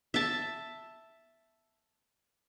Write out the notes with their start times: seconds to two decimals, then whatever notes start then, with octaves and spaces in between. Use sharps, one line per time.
0.14 E5 A5